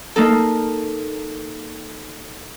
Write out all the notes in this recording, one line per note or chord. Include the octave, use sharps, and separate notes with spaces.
A#3 D#4 A4